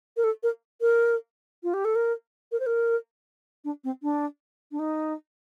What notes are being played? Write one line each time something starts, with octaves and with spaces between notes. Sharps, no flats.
A#4
A4
A#4
A#4
F4
G4
A4
A#4
A#4
C5
A#4
D4
C4
D4
D4
D#4